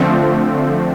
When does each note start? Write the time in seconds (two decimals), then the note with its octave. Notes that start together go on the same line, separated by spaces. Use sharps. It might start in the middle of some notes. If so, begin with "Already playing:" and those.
Already playing: D3 F3 A3 C4